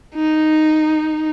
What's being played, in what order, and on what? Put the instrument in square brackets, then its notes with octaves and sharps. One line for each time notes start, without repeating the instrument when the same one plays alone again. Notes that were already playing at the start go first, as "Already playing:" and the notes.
[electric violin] D#4